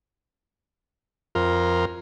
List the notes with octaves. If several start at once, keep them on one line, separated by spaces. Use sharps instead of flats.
F2 F4 A#4